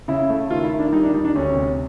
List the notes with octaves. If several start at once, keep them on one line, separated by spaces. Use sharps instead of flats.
C#3 E4
A3
D#3 F4
E4
D#3
D4
G3 D#4
D4
G3 D#4
D4
D2 C#4
C3